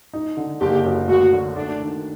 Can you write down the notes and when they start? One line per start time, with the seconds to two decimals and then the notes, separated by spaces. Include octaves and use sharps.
0.14 D#4
0.37 D3
0.61 F#1 G4
0.85 F#2
1.08 D2 F#4
1.32 D3
1.56 A3 D4
1.80 D#3